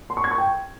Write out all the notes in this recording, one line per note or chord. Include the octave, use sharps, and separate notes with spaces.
C6
C#6
G#6
C#6
G5